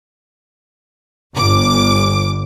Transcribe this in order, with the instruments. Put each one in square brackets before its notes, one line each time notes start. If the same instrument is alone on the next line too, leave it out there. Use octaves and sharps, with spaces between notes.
[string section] G1 D6